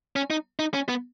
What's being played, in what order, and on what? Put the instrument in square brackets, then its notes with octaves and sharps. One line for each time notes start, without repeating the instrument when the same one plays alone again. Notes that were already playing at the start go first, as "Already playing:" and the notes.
[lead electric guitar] C#4
D#4
D#4
C#4
B3